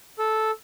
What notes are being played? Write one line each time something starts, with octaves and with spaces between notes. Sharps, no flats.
A4